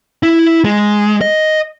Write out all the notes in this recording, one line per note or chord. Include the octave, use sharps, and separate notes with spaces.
E4
G#3
D#5